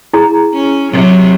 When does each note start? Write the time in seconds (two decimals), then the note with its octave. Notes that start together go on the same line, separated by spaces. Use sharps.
0.14 E4 G#4 A#5
0.53 C#4
0.91 C3 F#3